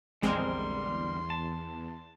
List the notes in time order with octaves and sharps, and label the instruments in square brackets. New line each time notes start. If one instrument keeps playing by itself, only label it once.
[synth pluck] A#1 G#3 C4 [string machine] E2 [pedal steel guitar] D3 G3 A#4 [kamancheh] C6
[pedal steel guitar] A5